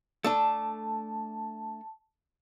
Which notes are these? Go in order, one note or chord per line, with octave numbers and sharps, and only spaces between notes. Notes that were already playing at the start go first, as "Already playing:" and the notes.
A3 D4 A4 A5